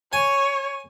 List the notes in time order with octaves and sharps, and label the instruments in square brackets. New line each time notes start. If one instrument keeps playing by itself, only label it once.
[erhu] C#5 [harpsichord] G#5